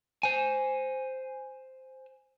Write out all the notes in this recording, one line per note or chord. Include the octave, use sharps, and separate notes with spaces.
C5 G#5